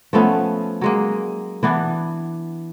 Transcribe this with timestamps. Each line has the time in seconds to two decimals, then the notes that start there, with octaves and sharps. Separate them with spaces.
0.13 F3 A3 B3 C#4
0.81 F#3 G#3 A#3
1.63 E3 B3 D4